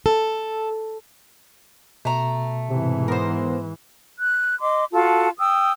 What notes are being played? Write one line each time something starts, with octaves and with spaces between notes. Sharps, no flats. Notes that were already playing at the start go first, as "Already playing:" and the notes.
A4
B2 A3 A#5
G#2 C3 E3
B3 A#4 C5
F#6
D#5 C6 D6
F4 F#4 A4 A5
G5 D#6 E6